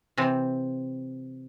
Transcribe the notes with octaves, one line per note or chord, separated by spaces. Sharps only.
C3 E3 C4